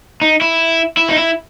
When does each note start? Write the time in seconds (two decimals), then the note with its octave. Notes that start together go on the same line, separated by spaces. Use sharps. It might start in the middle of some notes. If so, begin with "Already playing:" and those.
0.21 D#4
0.41 E4
0.97 E4
1.10 D#4
1.17 E4